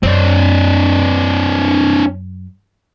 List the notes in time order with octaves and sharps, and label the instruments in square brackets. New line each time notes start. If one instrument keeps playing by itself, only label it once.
[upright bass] F#2 [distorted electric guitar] C4 D4